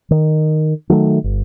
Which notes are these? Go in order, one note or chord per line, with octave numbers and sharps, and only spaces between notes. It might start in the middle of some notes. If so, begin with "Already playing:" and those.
D#3
D#3 F#3 A3
G1